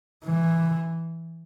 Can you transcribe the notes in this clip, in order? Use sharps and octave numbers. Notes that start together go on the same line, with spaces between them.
E3